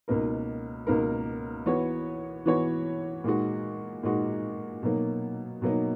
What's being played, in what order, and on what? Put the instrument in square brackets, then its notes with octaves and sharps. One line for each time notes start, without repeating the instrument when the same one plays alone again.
[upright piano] C#2 B2 A#3 D#4 A#4
C#2 B2 A#3 D#4 A#4
E3 B3 F#4 C#5
E3 B3 F#4 C#5
A#2 G#3 D#4 F#4
A#2 G#3 D#4 F#4
B2 F#3 A#3 D#4
B2 F#3 A#3 D#4